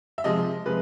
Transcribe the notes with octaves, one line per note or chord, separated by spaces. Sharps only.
E5
C3 F3 G#3 D#5
C3 F3 G#3 B4